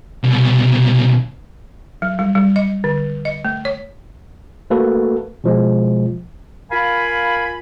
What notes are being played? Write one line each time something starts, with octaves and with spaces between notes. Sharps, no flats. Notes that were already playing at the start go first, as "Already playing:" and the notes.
C2 B2
F#3
G3
G3
D#5
D3
D#5
A3
C#5
A3 A#3 F#4 A4 B4
B2 F3 G#3
F4 A#4 F5 G#5 B5